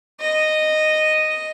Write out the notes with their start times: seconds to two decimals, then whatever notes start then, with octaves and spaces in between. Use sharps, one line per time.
0.20 D#5